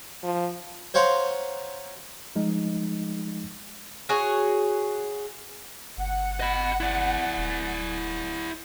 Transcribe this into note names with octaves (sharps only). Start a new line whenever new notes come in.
F3
C5 C#5 F5 F#5 A#5 C6
F3 G#3 D#4
F#4 G#4 C#5
G1 F#5
D#5 B5
E4 D5
D#1